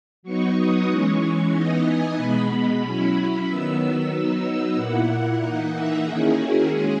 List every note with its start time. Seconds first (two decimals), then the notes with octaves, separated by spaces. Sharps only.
0.23 F#3 B3 D#4 C#6
0.56 D#6
0.88 E3 G#3 C#4 C#6
1.52 E3 B3 D#4 D#5
1.84 G#5
2.17 B2 G#3 B3 B5
2.82 F#3 C#4 E4
3.46 D#3 F#3 B3 E6
4.10 F#3 B3 D#4
4.75 A#2 A#3 E4 F#5
5.40 E3 A#3 D#4 F#5
5.73 E5
6.04 D#3 A#3 C#4 E4 G#4
6.38 F#4
6.69 G#3 C#4 G#4